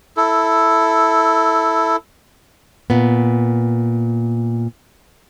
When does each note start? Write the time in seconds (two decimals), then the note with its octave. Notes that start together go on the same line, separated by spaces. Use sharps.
0.17 E4 A4
2.90 A#2 B3